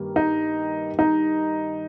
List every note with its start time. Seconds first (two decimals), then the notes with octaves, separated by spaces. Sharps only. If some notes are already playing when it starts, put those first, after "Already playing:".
Already playing: G2 D#3 G3 A#3
0.16 D#4
0.99 D#4